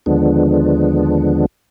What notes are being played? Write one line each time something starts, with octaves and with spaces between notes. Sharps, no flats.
D#2 D3 F3 G#3 B3 D4